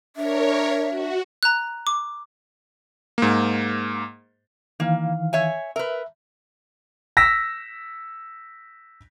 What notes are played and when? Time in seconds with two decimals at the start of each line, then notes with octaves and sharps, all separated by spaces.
0.16 D4 A#4 C#5 E5
0.89 F#4
1.43 A#5 F#6
1.87 D6
3.18 G#2 A#3
4.80 D#3 E3 A#3 F5
5.33 C#5 E5 G#5
5.76 A#4 B4 E5
7.17 E6 A#6 B6